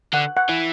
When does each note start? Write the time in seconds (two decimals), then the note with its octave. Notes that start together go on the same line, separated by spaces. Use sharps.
0.13 D3 F#5
0.37 F#5
0.49 E3